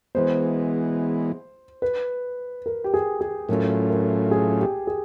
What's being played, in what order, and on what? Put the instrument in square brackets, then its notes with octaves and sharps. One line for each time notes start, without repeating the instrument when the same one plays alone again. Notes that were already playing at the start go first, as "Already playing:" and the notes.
[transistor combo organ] E3 G#3 B3 [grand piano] C5
[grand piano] B4
A#4
G4
G#4
G#4
[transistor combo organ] A2 F#3 A3 C#4 F4 [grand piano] A#4
[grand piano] A#4
G#4
G4
G#4